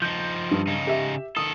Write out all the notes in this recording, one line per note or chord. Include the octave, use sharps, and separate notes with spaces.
F3 D#4 G6
G2
C#3 D#4
G4 E5
D#3 A4 D#6